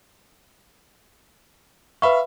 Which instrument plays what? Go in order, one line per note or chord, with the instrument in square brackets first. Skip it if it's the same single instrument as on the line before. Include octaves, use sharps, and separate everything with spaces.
[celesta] B4 B5 C#6 [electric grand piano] E5 F5